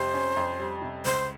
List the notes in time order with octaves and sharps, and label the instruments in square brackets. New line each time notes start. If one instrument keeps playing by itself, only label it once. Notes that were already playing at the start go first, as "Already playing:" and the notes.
Already playing: [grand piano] F2 C3 G3 [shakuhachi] C5
[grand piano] C#4
F2
G3
C3
[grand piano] C#2 [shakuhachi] C5